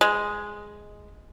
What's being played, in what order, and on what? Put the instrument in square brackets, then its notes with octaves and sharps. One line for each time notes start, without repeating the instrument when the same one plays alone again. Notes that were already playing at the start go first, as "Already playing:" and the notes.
[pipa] G#3